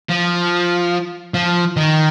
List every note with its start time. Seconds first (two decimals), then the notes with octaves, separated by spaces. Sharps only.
0.09 F3
1.34 F3
1.77 D#3